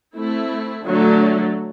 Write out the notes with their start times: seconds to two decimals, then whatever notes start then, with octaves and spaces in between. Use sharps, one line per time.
0.14 A3 C4 E4
0.83 D3 F#3 A3